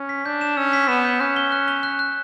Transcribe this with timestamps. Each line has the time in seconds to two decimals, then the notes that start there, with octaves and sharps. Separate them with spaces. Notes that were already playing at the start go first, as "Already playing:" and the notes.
Already playing: C#4
0.09 B6
0.25 D4 G6
0.41 E7
0.57 C#4 E6
0.73 B6
0.88 B3 E7
1.05 G6
1.20 C#4 F#6
1.36 G7
1.52 F#6
1.68 G7
1.83 F#6
1.99 F#6